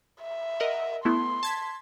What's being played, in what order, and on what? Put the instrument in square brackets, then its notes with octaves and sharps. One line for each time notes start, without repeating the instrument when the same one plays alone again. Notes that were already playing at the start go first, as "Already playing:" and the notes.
[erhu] E5
[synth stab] A#4 D#5 F#5
[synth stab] A3 B3 E4 [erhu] C6
[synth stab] A5 G#6 B6